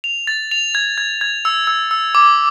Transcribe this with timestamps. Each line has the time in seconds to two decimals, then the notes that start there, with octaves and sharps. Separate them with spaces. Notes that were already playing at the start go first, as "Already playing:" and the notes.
0.04 F7
0.27 A6
0.51 F7
0.75 G#6
0.98 G#6
1.21 G#6
1.45 E6
1.67 E6
1.91 E6
2.15 D6